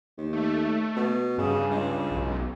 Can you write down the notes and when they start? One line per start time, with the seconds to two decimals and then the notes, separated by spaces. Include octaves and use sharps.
0.18 D#2
0.33 A3
0.96 B2
1.38 G2 C#3
1.71 C#2
2.11 B1